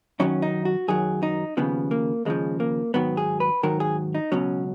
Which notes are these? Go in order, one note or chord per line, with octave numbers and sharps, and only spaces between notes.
F#2 D#3 F#3 C#4
D#4
F#4
F#2 D#3 F#3 G#4
D#4
D#2 C#3 F3 B3
A#3
D#2 C#3 F3 G#3
A#3
G#2 D#3 F#3 B3
G#4
B4
G#2 D#3 F#3 A#4
G#4
D#4
C#2 B2 F#3 C#4